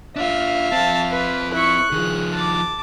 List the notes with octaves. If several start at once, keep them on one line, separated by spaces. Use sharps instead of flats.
D4 F4 E5 F5
F3 C4 A5
B4
E4 C#6 F#6
D#3 F3 G#4
A5 D6